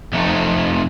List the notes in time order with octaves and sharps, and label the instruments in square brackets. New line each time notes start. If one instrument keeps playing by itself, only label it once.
[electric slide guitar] F2 C3 A3 D#4